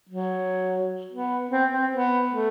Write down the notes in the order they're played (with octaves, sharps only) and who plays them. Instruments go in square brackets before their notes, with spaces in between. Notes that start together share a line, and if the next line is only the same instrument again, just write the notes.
[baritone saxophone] F#3
B3
C4
C4
B3
A3